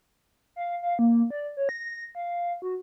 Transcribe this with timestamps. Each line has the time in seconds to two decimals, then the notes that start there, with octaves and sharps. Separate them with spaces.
0.56 F5
0.83 F5
0.99 A#3
1.30 D5
1.57 C#5
1.69 A#6
2.15 F5
2.62 F#4